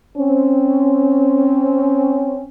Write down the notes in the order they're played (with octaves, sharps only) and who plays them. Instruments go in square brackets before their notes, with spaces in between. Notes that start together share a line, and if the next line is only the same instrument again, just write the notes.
[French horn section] C4 C#4